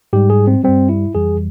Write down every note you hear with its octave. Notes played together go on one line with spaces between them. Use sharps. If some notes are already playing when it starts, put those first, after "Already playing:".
G#2 G3 G4
G#4
C4
G2 G3 C4
E4
F2 E3 G3 G#4